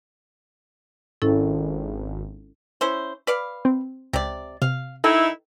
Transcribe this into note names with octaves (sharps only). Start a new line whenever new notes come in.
G#1 C#4 E4 A4
C#4 E4 C5
B4 D5 F5
C4
C#2 C3 D5
C3 F5
D#3 D#4 E4 A4